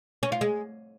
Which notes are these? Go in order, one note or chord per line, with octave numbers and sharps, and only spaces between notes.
C#4
F4
G#3